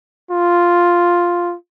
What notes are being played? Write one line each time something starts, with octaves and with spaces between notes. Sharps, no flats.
F4